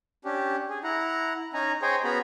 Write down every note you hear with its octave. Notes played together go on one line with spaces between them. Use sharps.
C#4 D4 G4
G#4
E4 F#5 A#5
C#4 D#4 G#5 A#5
G#4 C5 C#5 D#5 G5 G#5
B3 C#4 F#4 G#4 A#5 B5